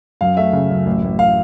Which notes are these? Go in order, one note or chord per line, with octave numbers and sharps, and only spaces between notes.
F#2 F5
A3 E5
C#3
F#2
A1
A1
F5